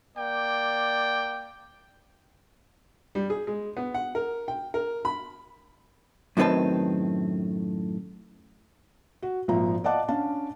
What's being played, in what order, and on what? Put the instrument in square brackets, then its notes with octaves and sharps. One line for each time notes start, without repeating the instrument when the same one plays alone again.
[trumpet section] A#3 D5 G5
[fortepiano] G3
G#4
G#3
B3
F#5
A#4
G5
A#4
B5
[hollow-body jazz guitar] F#2 A2 D#3 C4 B4 A5
[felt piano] F#4
G#1 A#2 F3 E5 A#5
D5 D#5 F5 F#5 A5 D6
C#4 D4 F5 A5